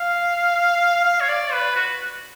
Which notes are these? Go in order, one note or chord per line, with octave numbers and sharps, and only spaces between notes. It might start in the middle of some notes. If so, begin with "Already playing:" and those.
Already playing: F5
F5
C#5
D5
B4
F#4